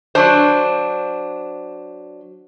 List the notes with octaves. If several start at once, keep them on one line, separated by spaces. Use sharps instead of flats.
F#3 D4 C5